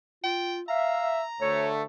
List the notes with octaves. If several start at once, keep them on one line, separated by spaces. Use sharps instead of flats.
F4 G5
E5 F5 A#5
D2 A3 C#5